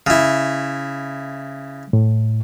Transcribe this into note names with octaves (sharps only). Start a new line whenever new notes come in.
C#3 E4
A2